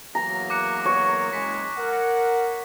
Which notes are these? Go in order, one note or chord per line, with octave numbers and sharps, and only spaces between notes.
E2 F#3 A#3 A#5 A#6
D6 F#6 C#7
C#5
F#1 G#3 B6
A#4 F#5